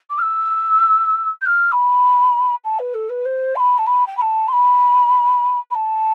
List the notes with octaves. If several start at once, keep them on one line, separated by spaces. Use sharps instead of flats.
D6
F6
E6
G6
F6
B5
A5
B4
A4
B4
C5
C6
B5
A5
B5
G5
B5
A5
C6
B5
B5
A5